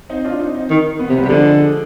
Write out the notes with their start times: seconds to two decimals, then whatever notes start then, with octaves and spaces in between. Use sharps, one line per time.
0.09 C4 D#4
0.24 D4 F4
0.39 C4 D#4
0.55 C4 D#4
0.70 D#3
0.99 B3
1.09 C3 C4
1.18 G3 B3
1.24 C3
1.29 D3 F3 G#3